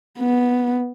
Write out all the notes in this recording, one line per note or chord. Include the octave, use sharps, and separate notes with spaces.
B3